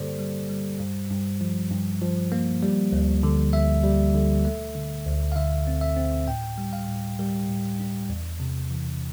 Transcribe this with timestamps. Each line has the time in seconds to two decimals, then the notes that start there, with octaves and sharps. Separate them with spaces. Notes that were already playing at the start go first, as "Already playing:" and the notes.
Already playing: G2 D3 G3 A#3 G4 A4 C5 D5
0.19 G3
0.49 G3
0.80 G2
1.10 G2
1.41 F3
1.71 G2
2.02 F3
2.32 A#3
2.63 G3
2.92 D2
3.23 D3
3.53 D2 E5
3.84 G3
4.15 D3
4.45 A3
4.75 D3
5.06 D2
5.32 F5
5.36 D3 E5
5.67 C4
5.81 E5
5.96 C4
6.27 A2 G5
6.58 G3
6.73 F5
6.88 A2
7.19 G3 A#4
7.49 A2
7.80 D4
8.10 E2
8.40 C3
8.71 E3